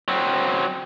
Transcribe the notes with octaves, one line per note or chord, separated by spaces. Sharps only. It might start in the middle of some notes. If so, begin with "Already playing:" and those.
F#3 C4